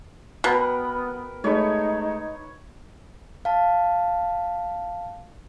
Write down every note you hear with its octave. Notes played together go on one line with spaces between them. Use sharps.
B2 B3 A#4 B4 F#5 G5
G#3 A3 D#4 C#5 B5
F5 A5